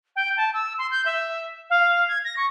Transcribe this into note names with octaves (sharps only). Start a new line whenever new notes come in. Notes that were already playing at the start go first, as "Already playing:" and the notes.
G5
A5
E6
C6
G6
E5
F5
G#6
A#6
C#6